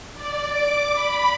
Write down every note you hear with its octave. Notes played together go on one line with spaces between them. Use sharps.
D5
D6
B5